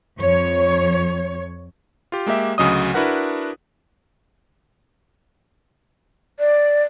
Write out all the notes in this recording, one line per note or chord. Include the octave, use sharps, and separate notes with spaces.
F2 C#5
F4 G4
G#3 A#3 G4 E5
D2 C#3 F#3 D#5 D#6
D4 E4 F#4 A#4 B4 F#5
D5